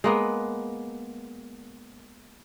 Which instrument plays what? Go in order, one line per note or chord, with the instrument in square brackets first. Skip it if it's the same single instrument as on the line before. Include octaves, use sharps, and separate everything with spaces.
[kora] G#3 A#3 B3